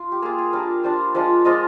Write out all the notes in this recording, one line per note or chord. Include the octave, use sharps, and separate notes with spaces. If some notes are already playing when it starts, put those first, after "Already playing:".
Already playing: F4
G4
A#3 F4 G#4
G#4
G3 D4 F4 A#4
G3 D4 F4 C5
F3 G#3 D4 F4
F3 G#3 D4 F4 D#5